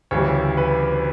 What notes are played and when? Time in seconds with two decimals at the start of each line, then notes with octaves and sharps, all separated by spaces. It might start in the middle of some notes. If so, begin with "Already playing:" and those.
0.11 D2 C#3 E3 G3 C#5
0.57 B4